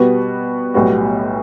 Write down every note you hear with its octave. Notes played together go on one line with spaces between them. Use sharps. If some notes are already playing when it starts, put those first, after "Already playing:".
Already playing: B2 G3 B3 F#4 B4
B1 A2 G3 B3 F#4